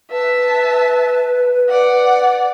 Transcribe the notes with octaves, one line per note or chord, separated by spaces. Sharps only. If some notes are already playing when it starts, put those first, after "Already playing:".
B4 E5 A5
D5 F#5